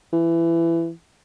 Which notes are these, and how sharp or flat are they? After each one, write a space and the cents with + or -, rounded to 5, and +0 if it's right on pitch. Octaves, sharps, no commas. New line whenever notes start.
E3 +20